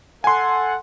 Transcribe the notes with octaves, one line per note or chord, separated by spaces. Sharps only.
A4 F#5 G#5 C6